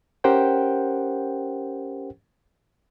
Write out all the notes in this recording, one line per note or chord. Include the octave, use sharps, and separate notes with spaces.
C#4 G4 A#4 C5 F#5 G5